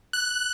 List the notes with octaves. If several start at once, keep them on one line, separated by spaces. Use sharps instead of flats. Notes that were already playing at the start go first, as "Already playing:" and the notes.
F#6